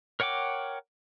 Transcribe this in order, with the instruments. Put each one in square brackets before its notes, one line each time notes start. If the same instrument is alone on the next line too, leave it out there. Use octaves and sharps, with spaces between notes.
[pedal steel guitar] A#4 C#5 F#5 G5 D6